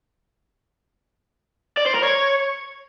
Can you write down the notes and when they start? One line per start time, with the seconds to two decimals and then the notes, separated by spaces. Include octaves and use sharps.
1.77 D5
1.86 C5
1.94 A#4
2.03 C#5